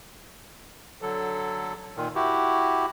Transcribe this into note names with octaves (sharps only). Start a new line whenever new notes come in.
D3 F#3 A4
A#2 D#3
E4 F#4 G4